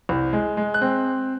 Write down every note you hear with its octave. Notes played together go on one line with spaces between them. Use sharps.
C2
G#3
G#3
F#6
C4